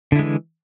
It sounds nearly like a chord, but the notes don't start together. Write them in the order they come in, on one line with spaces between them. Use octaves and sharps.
D3 E4 G#3 E3